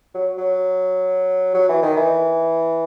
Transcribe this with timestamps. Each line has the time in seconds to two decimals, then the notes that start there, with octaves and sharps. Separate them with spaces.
0.14 F#3
0.38 F#3
1.54 F#3
1.69 E3
1.82 D#3
1.97 E3